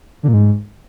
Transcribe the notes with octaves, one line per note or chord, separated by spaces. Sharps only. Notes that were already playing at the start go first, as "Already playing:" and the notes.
D3
A#2
G#2